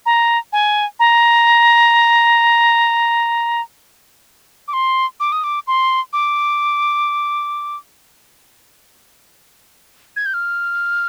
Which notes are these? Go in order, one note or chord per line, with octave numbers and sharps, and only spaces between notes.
A#5
G#5
A#5
D6
C6
D6
D#6
D6
C6
D6
G#6
G6
F6